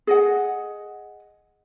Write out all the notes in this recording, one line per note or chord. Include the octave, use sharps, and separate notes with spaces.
G#4 D#5 F#5